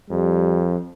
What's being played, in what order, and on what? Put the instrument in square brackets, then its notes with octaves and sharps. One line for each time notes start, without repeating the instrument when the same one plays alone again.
[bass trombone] F2 [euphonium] G3